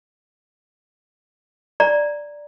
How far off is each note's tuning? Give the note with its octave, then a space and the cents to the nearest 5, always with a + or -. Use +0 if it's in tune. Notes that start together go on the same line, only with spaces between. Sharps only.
D5 +0 A#5 +0